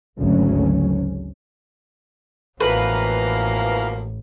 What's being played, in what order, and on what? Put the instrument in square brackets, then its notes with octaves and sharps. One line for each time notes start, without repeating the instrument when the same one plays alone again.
[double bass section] G#1 D2 C#3 F#3 C#4
[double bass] A1 [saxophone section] B2 F3 A#3 [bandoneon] E3 F5 A#5 [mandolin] B4